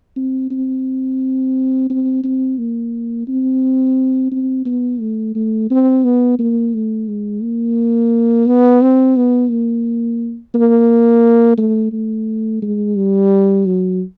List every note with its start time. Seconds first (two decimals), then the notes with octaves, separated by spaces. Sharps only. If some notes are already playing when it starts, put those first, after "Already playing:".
0.16 C4
0.51 C4
1.90 C4
2.24 C4
2.58 A#3
3.28 C4
4.31 C4
4.65 B3
5.00 A3
5.35 A3
5.70 C4
6.04 B3
6.39 A#3
6.74 A3
7.08 G#3
7.42 A#3
8.47 B3
8.82 C4
9.16 B3
9.50 A#3
10.55 A#3
11.58 A3
11.92 A3
12.62 G#3
12.97 G3
13.66 F#3